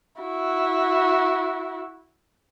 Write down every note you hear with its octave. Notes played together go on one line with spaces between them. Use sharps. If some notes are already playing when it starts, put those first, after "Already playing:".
E4 F#4